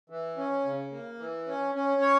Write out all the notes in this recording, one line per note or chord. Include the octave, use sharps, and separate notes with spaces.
E3
C#4
C#3
A#3
E3
C#4
C#4
C#5